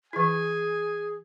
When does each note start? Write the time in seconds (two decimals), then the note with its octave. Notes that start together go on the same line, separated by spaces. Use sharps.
0.13 E3 E4 G#4 G#5